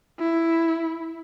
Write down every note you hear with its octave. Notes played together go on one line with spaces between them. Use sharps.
E4